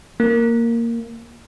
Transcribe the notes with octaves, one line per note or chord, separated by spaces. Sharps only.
A#3